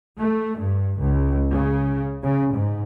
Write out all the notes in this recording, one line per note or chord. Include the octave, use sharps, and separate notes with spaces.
A3
G2
C#2
C#3
C#3
G#2